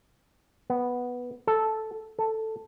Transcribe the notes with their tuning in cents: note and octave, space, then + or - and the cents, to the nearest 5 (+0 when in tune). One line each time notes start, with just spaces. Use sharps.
B3 -5
A4 -5
A4 +5